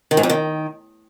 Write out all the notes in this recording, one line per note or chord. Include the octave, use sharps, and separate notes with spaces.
D#3
G#2
F2
D#3